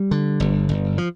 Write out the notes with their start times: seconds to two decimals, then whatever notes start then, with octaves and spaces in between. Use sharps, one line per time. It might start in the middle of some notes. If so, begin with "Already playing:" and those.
Already playing: G3
0.11 D3
0.40 G1
0.69 G1
0.98 F3